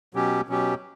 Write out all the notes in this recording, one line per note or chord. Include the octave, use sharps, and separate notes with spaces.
B2 F#3 C#4 G4
B2 F#3 C#4 G4